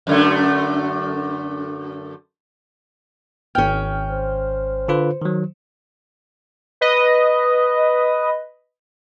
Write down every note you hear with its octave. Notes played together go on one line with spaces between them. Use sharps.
F#2 D3 A3
G#1 C#4 G5 F6
C5
D3 F4 B4
D#3 F#3
B4 D#5